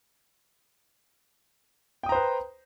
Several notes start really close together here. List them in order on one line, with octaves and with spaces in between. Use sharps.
G5 D#6 A#5 C5 B4